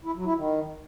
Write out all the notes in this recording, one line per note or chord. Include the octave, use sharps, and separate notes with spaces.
E4
F#3
E4
D#3